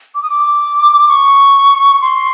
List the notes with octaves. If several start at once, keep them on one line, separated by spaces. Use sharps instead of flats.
D6
D#6
D6
C#6
C6